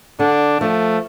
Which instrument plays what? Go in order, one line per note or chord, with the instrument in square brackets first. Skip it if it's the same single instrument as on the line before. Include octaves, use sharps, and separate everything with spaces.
[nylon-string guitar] D3 [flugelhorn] D4
[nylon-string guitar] F3 [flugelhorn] A3